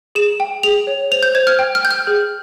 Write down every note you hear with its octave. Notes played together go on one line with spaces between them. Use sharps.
G#4 E7
G5
G#4 F7
C#5
C5 F7
G6
C5 G#6
F6
G5
F6
G5 G6
F6
G#4